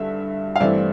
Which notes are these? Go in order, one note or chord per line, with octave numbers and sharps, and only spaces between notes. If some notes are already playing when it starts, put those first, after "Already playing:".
Already playing: G2 D3 A3 E5
F5
G2 E3 A3 C4 D5 E5